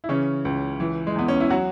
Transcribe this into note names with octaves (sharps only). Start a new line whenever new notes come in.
E4
C#3 E3 C#4
C#2
E3
G#3
E2 B3
C#4
E4
F#3 F#4